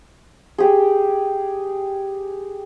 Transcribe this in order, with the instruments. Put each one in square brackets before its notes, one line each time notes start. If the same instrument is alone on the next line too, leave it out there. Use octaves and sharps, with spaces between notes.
[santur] G4 G#4